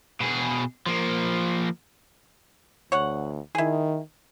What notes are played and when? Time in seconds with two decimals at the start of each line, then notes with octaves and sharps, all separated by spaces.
0.21 B2 G#4
0.86 F3 A#3
2.92 D2 C#5 F#5
3.55 D#3 E4 G#4